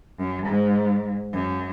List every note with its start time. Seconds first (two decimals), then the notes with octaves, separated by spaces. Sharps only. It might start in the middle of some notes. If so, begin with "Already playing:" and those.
0.19 F#2
0.47 G#2
1.33 F#2